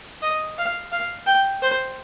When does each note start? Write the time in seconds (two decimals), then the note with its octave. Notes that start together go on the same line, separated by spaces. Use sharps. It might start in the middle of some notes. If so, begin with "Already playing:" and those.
0.22 D#5
0.58 F5
0.92 F5
1.26 G5
1.62 C5